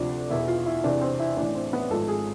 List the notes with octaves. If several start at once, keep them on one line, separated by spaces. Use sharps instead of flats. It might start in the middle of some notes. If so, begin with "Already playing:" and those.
Already playing: D2 C3 F3 D4
E2 B2 E4
F4
E4
E2 C3 E3 D4
C4
E4
A1 A2 E3 D4
C4
B3
G#1 G#2 F3 A4
G#4